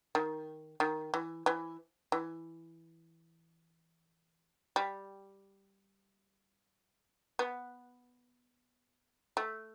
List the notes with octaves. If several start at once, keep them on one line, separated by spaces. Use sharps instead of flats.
D#3
D#3
E3
E3
E3
G3
B3
A3